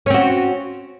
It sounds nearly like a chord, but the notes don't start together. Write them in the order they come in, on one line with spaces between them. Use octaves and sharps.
C#4 C4 F#4